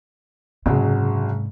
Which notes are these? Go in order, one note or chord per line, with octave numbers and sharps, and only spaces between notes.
F#1 G#2 C3 F#3 G#3